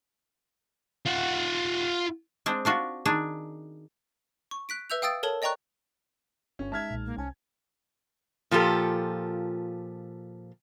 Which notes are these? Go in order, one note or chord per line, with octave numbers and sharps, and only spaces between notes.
F4 F#5
G#3 C4 D4
D4 F4 F#4
D#3 D4 G#4
C#6
F#6 B6 D7
B4 E5 E6 G6 F7
F5 G5 D#6 E6 A6 D7
A4 A#4 C#5 A5 E7
D5 D#5 G5 A#5 C#6 F#6
G1 G2 C#4
G#3 D#4 E5 A5 F6 G#6
B1 A#2
A#3
C2 C#4 G#5 A5
A#2 F3 F4 G4 A4